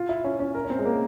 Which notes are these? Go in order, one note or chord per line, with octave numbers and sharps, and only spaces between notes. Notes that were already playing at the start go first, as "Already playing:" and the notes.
Already playing: F4
E4
C#4
C#4
A#4
C#4
C4
G#3
A#3